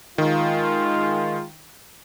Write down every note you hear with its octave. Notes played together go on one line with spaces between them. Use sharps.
D#3 G#3 F4